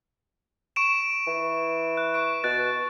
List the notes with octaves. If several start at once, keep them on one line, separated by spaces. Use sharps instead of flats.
C#6 D7 E7
E3
F#6
C#6 D7
B2 F#6 A6